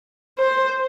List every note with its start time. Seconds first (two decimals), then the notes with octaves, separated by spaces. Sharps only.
0.39 C5